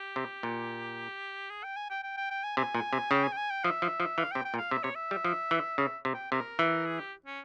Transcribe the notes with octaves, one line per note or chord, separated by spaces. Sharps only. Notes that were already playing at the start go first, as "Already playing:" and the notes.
Already playing: G4
C3
A#2
G#4
G5
G#5
G5
G5
G5
G5
G#5
C3 G#5
A#2
C3
C#3 G5
G#5
G5
G#5
G5
F3 E5
F3
F3
E3 F5
C3 G5
G5
A#2
F5
C3 E5
C3 C#5
E5
G3
F3
E3
C#3 E5
C3
G5
C3 A#4
E3
G#4
G4
C#4